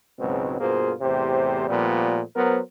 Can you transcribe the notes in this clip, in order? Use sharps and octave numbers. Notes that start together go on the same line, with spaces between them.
C#2 G#2 B2 F#3 G#3 C4
G2 B2 A#3 F4 G#4 C5
E2 A2 C3 G4 C5
A#2 F3 G3 A3 B3 F4
F#3 B3 A#4 C5